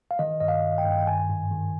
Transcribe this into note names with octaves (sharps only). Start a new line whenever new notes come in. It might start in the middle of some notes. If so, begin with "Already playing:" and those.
F5
D#3 D#5
G2 D#5
F5
D#3
G5
G2
G5
D#3 G#5
G#2
D#3